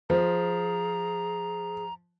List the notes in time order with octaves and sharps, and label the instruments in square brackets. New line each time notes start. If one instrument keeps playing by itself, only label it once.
[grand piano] F3 [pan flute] G#4 [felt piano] C5 [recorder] A#5